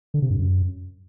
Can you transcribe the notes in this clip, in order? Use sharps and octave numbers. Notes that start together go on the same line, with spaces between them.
D3
C3
G2
F#2